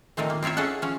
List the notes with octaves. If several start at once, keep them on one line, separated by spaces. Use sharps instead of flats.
A#2 D#3 F3 A3 C4
A#3
C4 E4 F4 C#5 E5
C#4 G#4 A4 E5 F#5
F3 C#4